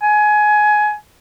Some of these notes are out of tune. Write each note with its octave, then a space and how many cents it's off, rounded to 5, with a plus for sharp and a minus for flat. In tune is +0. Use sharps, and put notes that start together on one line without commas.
G#5 +20